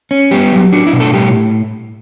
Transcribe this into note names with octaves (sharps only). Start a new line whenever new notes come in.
C#4
G3 B3 G4
F#3
D4 F#4
E4
B2
A3 A4
A2 G3 G4